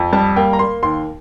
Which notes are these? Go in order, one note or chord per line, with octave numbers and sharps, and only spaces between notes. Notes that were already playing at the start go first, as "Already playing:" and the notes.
Already playing: F2
G3 A5
A#3 G5
A#5
A#3 C6
D#2 C6